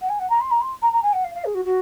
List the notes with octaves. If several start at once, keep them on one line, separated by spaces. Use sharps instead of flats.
F#5
G#5
F#5
A#5
C6
A#5
C6
A#5
A#5
G#5
F#5
F5
F5
G#4
F#4
F#4